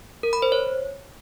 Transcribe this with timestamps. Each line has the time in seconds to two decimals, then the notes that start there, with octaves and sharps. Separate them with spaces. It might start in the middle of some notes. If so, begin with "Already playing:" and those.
0.23 A#4
0.33 B5
0.42 C5
0.52 C#5